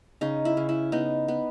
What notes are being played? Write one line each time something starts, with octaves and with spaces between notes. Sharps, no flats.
C#3 D#4
E4
C#3
E4
B3 D#4
B3